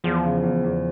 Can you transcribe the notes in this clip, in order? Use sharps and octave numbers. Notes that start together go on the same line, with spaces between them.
E2 F3
C#3
E2
E2